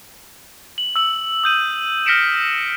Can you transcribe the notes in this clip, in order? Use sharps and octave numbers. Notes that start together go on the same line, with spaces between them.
F#7
E6 F#7
D#6 G6 D#7
F6 A#6 B6 C#7 D7 E7